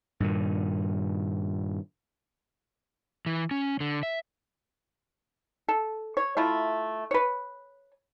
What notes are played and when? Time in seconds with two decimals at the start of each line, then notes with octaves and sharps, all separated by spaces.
0.20 G2 A#2 D#3
3.26 E3
3.51 C#4
3.80 D3
4.03 E5
5.69 A4
6.17 C#5
6.37 A3 E4 F4
7.11 B4 C#5